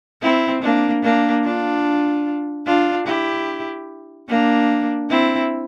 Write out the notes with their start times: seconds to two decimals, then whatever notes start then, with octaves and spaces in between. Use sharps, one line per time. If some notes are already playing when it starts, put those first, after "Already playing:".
0.22 C4 E4
0.63 A#3 D4
1.03 A#3 D4
1.45 D4 F4
2.66 D4 F4
3.07 E4 G4
4.29 A#3 D4
5.10 C4 E4